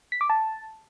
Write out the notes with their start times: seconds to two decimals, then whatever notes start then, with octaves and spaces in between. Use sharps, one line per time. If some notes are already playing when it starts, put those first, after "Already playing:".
0.12 B6
0.21 D6
0.30 A5